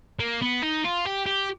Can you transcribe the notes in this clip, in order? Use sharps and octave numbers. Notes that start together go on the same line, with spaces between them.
A#3
B3
D#4
F4
G4
G4